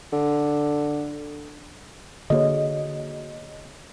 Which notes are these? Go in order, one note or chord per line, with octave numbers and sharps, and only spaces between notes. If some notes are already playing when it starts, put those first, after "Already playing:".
D3
D3 A#3 F#4 G#4 C#5 D#5